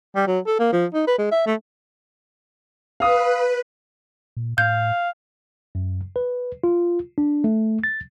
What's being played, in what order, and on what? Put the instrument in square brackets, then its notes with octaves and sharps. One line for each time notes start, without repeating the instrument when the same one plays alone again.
[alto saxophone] G3
F#3
A4
A#3
F3
D#4
B4
G#3
E5
A3
[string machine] B4 [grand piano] F5 D#6
[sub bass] A#2
[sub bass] A2 [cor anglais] F5 [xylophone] G6
[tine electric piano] F#2
B4
F4
D4
A3
A6